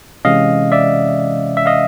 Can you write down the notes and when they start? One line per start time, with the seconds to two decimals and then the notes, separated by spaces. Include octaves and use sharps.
0.25 C3 E3 G#3 C#4 D#5 F5
0.72 D5 E5
1.57 E5
1.66 D#5 F5